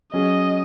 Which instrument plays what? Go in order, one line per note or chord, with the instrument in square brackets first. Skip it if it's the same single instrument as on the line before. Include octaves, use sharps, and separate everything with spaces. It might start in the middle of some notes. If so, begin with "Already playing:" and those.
[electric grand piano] F#3 C#4 G#4 [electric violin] D#5